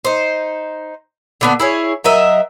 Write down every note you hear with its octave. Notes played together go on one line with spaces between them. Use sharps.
D#4 C5
D3 B3 D4
E4 G#4 C#5
F#3 A#4 D#5 E5